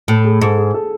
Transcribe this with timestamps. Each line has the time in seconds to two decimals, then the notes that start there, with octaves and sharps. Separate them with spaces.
0.08 A2 A4
0.24 G#4
0.41 G#2 A4
0.58 G#4
0.74 A4